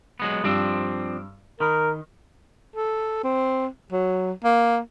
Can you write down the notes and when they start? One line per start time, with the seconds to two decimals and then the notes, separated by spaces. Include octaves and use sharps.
0.20 F#3 G#3 B3
0.44 G2 F3 C4 D4 E6
1.60 D#3 A#4 B5
2.74 A4
3.24 C4
3.92 F#3
4.44 A#3